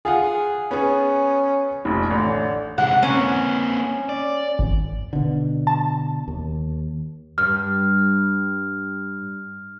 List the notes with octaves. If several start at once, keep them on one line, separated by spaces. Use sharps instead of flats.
F4 G#4 F5 F#5
B3 C#4 G#4
F1 A#1
A1 D3
C3 G#3 F#5
A#3 C4 C#4
D5
G#1
B2 D3
A5
D#2
G2 F6